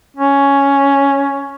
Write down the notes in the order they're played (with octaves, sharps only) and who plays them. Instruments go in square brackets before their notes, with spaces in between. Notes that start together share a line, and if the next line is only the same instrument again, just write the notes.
[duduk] C#4